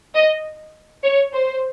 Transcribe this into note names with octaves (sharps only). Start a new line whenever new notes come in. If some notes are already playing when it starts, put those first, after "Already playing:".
D#5
C#5
C5